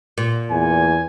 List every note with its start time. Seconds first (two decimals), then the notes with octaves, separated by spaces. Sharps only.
0.18 A#2
0.51 E2 G#5